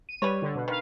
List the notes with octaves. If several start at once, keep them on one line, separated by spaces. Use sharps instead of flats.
D#7
G3 B4 C#5
D3
B2
D#3 B4 F5